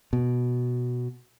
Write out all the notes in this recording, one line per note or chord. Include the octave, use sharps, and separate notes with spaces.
B2